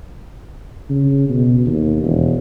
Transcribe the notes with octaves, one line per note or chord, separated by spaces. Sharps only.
C#3
B2
D#2
E1